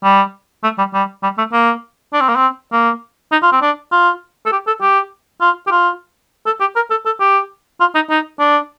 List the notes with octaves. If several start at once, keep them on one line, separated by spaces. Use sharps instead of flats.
G3
A3
G3
G3
G3
A3
A#3
D4
C4
A#3
C4
A#3
D#4
F4
C4
D4
F4
A4
G4
A4
G4
F4
G4
F4
A4
G4
A#4
A4
A4
G4
F4
D#4
D#4
D4